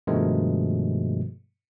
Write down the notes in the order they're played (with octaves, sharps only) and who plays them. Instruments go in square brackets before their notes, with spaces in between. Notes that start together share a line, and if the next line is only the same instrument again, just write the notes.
[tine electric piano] G2 B2 D#3 F3 G#3 A3